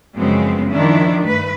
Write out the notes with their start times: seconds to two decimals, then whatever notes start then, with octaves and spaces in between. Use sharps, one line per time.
0.16 F#2 C#3 F3 G#3 B3 C4
0.72 D#3 F3 D4 E4
1.24 G2 A3 B4